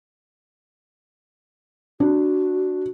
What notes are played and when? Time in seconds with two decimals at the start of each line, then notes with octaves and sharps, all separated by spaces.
2.00 D4 F#4